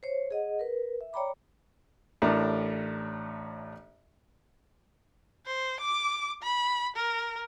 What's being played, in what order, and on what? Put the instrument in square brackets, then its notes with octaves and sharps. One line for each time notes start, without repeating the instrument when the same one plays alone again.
[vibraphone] C5 C#5
G#4 D#5 F#5
A#4 B4
E5
C#5 D5 G5 A#5 B5 D6
[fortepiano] A1 A2 D4 A#4
[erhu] C5
D6
B5
A#4